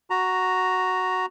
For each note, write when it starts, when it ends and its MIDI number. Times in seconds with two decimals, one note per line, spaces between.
0.10 1.26 66
0.10 1.26 82